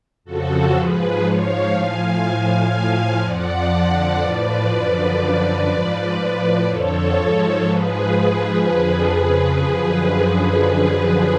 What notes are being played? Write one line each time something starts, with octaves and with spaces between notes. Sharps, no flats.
F2 C#3 F3 F#4 A4
G#2 F3 G#4 B4
G#2 F3 C#5 F5
A2 F3 F5 G#5
A2 F3
A2 F3 F5 G#5
F2 F3 D5 F#5
F2 D3 F3
A2 F3 B4 D5
F#2 D3 F3
F#2 D3 F3
G#2 F3
A2 F3 B4 D5
F2 D3 F3 A4 C#5
G#2 F3
G#2 F3 G#4 B4
G#2 F3 G#4 B4
F2 D3 F3
F2 C#3 F3
F#2 D3 F3